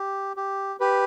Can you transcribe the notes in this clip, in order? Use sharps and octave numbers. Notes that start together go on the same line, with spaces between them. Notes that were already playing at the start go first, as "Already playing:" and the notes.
Already playing: G4
G4
G4 B4